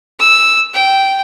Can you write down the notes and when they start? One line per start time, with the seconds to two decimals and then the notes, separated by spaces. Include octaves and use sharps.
0.20 E6
0.74 G5